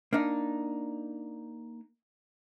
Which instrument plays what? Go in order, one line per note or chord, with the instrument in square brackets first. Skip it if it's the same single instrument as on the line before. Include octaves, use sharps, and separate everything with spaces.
[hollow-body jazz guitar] A#3 D4 D#4